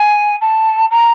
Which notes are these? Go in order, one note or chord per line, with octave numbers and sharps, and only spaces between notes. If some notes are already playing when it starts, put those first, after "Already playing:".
Already playing: G#5
A5
A#5